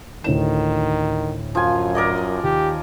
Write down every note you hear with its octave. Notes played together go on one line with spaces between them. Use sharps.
D2 A2 D#3 E7
F#2 F3 G#5
A#4 D5 D#5
D#2 G4